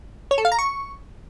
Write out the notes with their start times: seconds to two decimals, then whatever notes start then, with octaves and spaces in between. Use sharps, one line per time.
0.31 C#5
0.38 A4
0.45 F5
0.52 A#5
0.59 C#6